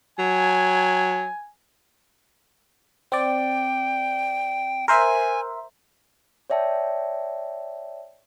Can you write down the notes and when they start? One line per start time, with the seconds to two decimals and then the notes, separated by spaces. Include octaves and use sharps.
0.19 F#3 G#5
3.12 C4 D5 G5
4.88 A#4 C5 E5 G#5
6.50 C#5 D5 E5 G5 A5